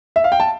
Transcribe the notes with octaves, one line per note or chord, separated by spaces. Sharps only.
E5
F5
G5
A5